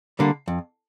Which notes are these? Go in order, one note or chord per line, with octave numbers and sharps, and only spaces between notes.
D3 G3 A#3
F2